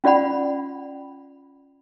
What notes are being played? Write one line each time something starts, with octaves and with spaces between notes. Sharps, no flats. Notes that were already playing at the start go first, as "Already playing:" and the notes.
C#4 F4 D5 F#5 B5